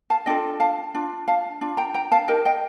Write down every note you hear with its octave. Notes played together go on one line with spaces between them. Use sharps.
F5 A5
D4 F4 A4 D#5 G5
F5 A5
D4 F4
F5 A5
D4 F4
G5 A#5
G5 A#5
F5 A5
D#4 G4 A#4 D#5 G5
D#5 G5